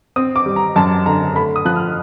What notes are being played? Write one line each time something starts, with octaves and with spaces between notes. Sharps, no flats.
C4 D#6
D6
G3
A#5
F#2 A5
D3 A#5
A3 B5
D#6
F3 F#6
F6